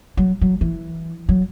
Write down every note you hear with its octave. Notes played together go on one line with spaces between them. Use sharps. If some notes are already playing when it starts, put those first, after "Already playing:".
F#3
F#3
E3
F#3